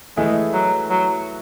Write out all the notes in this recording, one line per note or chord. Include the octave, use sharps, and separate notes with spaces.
E3 G#3 A3 E4 G#4
F#3
F#3